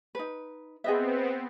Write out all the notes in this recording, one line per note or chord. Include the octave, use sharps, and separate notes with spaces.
D#4 B4
B3 C4 G#4 D#5 E5